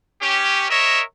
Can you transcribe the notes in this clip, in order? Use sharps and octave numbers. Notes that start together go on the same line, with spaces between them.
C#4 G4
A#4 C#5 D#5 E5